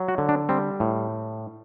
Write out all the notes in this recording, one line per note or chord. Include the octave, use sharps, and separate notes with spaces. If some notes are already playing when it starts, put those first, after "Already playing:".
Already playing: F#3
F#4
D3
D4
G3 C4
A2